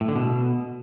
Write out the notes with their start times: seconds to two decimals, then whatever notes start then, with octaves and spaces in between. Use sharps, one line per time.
0.01 A2
0.08 D3
0.16 B2